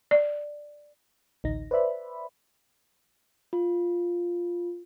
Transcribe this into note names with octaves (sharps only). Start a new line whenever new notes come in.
D5
A1 D2 D#4 A#6
B4 C5 D5 E5 B5
F4